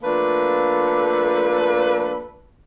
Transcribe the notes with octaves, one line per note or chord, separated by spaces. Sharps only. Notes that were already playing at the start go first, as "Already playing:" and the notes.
F3 A3 A#3 D4 A4 B4